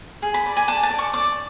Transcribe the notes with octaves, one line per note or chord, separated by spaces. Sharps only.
G#4
B5
D5
G#5
D5 A5
A5
D5
C#6
D5 D6